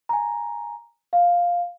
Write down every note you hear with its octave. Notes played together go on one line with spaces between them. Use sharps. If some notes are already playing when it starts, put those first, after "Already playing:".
G#5 A#5
F5